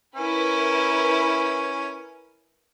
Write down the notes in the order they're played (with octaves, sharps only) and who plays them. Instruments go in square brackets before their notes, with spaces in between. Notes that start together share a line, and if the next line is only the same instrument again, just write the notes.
[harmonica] C#4 [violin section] E4 A#4 B4